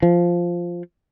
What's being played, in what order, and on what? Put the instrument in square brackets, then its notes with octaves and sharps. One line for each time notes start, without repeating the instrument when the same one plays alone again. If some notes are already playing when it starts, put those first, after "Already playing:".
[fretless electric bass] F3